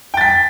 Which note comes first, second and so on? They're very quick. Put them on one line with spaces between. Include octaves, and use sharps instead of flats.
G5 A6 B6